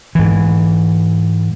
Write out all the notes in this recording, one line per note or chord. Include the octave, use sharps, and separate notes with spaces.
G#2 E3